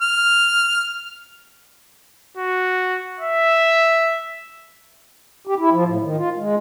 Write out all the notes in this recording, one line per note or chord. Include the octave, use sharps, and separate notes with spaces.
F6
F#4
E5
G4
E4
F3
A2
D#3
F4
G#3